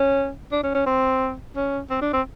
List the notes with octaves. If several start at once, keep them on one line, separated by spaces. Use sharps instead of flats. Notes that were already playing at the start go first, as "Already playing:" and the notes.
Already playing: C#4
D4
C#4
C#4
C4
C#4
C4
D4
C4